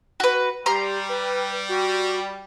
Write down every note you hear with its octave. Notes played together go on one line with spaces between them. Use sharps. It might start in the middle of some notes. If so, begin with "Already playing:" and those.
F#4 B4
G3 G4 A#5 C6
B4
F#4